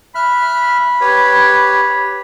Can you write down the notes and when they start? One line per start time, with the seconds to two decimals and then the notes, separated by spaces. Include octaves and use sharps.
0.15 E5 B5 F6 F#6
1.01 G4 B4 C#5